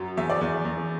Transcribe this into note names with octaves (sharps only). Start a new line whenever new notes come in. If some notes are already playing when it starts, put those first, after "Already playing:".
Already playing: F#2 F#3
E2 E5
D5
E2
E2